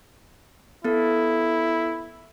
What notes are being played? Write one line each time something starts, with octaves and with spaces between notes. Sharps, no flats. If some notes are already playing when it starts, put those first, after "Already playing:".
B3 E4 A4